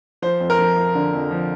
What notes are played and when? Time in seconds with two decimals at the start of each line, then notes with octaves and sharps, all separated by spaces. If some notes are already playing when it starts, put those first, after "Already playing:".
0.22 F3 C5
0.40 F2
0.50 A#4
0.59 F3
0.76 F3
0.95 D3
1.13 F2
1.31 F3